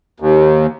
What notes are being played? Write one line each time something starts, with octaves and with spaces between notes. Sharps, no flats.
D#2